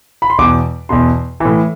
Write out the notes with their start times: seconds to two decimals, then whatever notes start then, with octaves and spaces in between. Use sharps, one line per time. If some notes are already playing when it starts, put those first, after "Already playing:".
0.22 B5
0.30 C6
0.38 E2 B2 D6
0.89 E2 B2 C6
1.40 A2 E3